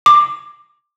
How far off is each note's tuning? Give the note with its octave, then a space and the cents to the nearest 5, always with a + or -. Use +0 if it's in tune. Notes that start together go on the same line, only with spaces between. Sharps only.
D6 +15